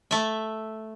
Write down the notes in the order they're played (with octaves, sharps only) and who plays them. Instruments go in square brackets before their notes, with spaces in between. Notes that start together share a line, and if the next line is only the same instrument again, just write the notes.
[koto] A3 E5